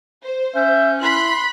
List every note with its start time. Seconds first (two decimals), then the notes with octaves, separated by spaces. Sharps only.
0.23 C5
0.55 C#4 E5 G6
1.02 E4 B5 C6 F#6